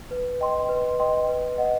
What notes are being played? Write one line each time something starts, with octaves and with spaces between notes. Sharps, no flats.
B4
D#5 G5 C6
B4
D#5 G5 C6
B4
D#5 F#5